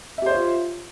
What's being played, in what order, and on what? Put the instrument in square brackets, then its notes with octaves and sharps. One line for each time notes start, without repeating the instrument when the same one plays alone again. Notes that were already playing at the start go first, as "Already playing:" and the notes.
[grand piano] E5
G4
C5
C#5
F4